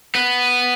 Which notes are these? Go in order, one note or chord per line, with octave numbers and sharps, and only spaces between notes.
B3